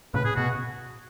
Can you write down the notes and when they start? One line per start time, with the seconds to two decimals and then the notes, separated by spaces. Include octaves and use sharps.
0.14 A2 C#3 B4
0.25 G#4
0.37 B2 F#4